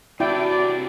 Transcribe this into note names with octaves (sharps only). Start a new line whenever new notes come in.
C3 D4 E4 F#4 D5 G5